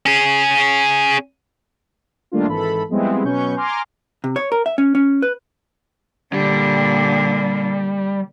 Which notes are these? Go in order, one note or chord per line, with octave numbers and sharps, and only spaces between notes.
C#4 G#4
D#3 G3 A3 A#3 D4 F4
G#1 E3 A4 B5
F3 G3 G#3 B3 C4 E4
B2 F#3 C#4 B4 C#6 G6
G#5 A#5 C6 D6 F6
C3
C#5
A#4
E5
C#4
C#4
B4
A#2 D3 G3